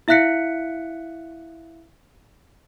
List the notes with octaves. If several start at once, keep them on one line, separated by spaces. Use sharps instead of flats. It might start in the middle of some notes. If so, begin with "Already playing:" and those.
E4 E5 F5 F#6 B6 C#7